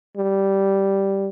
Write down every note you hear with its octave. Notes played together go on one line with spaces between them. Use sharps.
G3